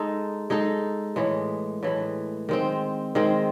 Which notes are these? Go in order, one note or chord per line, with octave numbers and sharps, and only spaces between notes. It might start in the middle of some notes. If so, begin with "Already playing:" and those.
Already playing: G#3 D#4 A4
G#3 D#4 A4
A2 E3 G#3
A2 E3 G#3
D#3 G#3 C4
D#3 G#3 C4